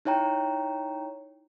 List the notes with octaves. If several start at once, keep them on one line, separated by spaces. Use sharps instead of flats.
D#4 E4 C#5 G5 A#5